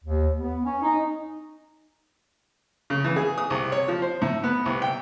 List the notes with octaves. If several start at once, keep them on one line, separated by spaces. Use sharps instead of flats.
D#2
B3
C#4
D#4
C#3
E3
G#4
D#6
C2
C#5
F3
C5
A2
B3
C2
G5